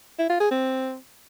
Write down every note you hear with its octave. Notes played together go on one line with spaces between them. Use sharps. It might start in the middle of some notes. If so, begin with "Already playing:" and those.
E4
F4
G#4
C4